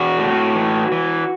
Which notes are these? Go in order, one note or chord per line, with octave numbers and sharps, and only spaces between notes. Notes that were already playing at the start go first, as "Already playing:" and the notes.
Already playing: E2 F#4
A2
E3
E3